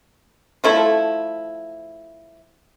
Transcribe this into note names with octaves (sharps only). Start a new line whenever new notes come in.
F3 A3 E4